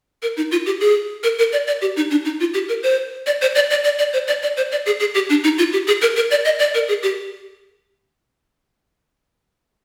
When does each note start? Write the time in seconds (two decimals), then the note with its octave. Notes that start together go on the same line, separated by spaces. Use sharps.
0.22 A#4
0.37 D#4
0.52 F4
0.66 G4
0.80 G#4
1.23 A#4
1.39 A#4
1.52 D5
1.67 D5
1.81 G4
1.96 D#4
2.11 D4
2.25 D#4
2.40 F4
2.54 G4
2.69 A#4
2.83 C5
3.26 D5
3.41 C5
3.55 D5
3.70 D5
3.84 D5
3.98 D5
4.13 C5
4.28 D5
4.42 D5
4.57 C5
4.72 D5
4.86 G#4
5.00 G#4
5.14 G4
5.30 D4
5.44 D#4
5.58 F4
5.73 G4
5.87 G#4
6.02 A#4
6.16 A#4
6.31 D5
6.45 D#5
6.59 D5
6.74 A#4
6.88 G#4
7.03 G4